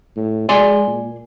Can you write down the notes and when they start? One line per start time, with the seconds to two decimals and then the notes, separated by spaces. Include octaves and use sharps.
0.16 A2
0.49 G#3 D5 G#5 C6
0.87 A#2